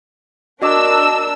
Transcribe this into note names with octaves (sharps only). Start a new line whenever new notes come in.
D4 F#4 A#4 D#5 D6 E6